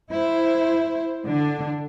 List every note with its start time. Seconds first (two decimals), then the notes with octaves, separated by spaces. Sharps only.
0.11 E4 C5
1.25 D3 D4